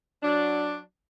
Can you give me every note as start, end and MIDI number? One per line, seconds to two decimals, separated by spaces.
0.23 0.80 54
0.23 0.80 62